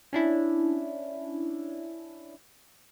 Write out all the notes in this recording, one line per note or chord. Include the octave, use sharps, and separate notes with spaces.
C#4 D4 E4